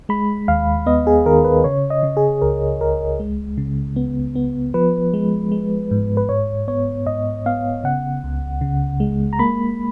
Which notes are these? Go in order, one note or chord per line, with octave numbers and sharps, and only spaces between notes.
G#3 B5
D#2 F5
B3 D#5
G#4
D#3 A#4
B4
C#3 C#5
D#5
C#3
G#4
C#2 A#4
C#2 A#4
G#3
C#3
B3
B3
F3 B4
G#3
G#3
G#2
B4
G#2 C#5
B3 C#5
G#2 D#5
B3 F5
C#3 F#5
C#2
C#3
G#3
A#5
A#3 B5